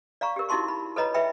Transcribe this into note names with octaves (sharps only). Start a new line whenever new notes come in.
D5 F5 A#5 C#6
G4 A#4
D#4 E4 F#4 A5 C6 C#6
B5
A4 B4 C#5 D#5 A#5 B5
B4 E5 G5 B5